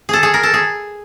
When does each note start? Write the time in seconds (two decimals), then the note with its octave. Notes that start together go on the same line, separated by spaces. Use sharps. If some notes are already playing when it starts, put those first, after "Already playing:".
0.09 G#4 A4
0.23 G#4
0.34 A#4
0.43 A4
0.54 G#4